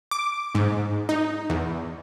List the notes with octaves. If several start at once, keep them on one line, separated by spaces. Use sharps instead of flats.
D6
G#2
D#4
E2